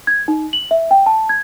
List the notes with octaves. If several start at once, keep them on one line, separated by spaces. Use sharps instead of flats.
G#6
D#4
F#7
E5
G5
A5
G#6